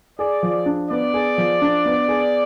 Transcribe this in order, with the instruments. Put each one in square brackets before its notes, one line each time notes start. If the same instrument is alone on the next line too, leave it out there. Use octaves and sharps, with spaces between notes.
[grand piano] G#4 [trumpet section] D5
[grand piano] F3
D4
[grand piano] B3 [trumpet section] D5
[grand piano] G#4
F3
D4
B3
G#4